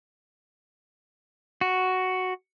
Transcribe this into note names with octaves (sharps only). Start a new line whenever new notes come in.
F#4